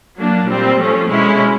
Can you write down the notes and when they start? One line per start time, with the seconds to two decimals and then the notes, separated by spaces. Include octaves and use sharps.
0.19 F#3 A#3 D4
0.48 A#2 G3 C4
0.80 F3 A3 C#4
1.10 B2 G#3 C#4 E4